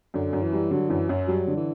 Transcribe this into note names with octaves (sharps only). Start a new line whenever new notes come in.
F#2 D3
F#2
E3
G3
D3 F#3
F#2 E3
F#2 F#3
F#3 G3
D3
E3